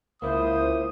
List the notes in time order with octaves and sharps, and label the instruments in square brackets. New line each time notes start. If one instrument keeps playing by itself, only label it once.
[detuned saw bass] C#2 [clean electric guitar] A#3 E4 [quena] C5 [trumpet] D#6